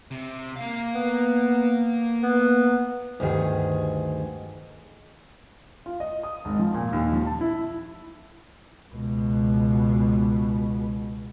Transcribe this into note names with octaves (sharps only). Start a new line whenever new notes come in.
C3
A#3 F5
B3
B3
D2 G2 D#3 G#4
F4
D#5
D#6
G#1
F3
A#2
D#2
F3
A5
E4
C#2 B2